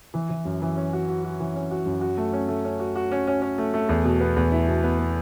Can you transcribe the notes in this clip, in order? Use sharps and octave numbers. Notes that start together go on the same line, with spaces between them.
E3
E3
F#2
E3
C#4
F#4
F#4
F#4
E3
C#4
F#4
F#2
F#4
A3
C#4
A3
C#4
F#4
F#4
C#4
C#4
C#4
A3
A3
E2
B2
B3
E2
E4
B2
B3
B3